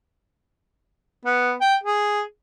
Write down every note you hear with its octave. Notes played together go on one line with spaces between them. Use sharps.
B3
G5
G#4